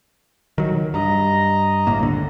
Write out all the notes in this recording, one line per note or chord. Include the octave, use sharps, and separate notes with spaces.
D#3 F#3
G2 D#5 A#5
G1 A2 A#3
C#2 D3